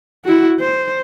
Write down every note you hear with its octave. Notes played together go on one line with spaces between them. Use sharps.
E4 F#4
C5